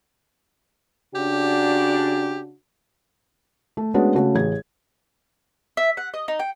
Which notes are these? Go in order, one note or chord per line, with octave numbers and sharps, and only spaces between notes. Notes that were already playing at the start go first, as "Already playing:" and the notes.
C#3 D4 F#4 G4
A3
G#3 A3 B3 C#4 D4 F#4
C#3 A3 F#4
A1 G#4 G#6
E5
F#5
D#5
D#4
G5